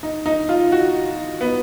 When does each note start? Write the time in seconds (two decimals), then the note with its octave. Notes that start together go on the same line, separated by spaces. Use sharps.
0.03 D#4
0.26 D#4
0.49 F4
0.72 F#4
1.41 B3